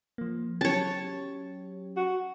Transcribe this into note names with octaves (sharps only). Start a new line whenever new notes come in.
F3 A#3
F#3 C#4 G4 C#5 A5
F#4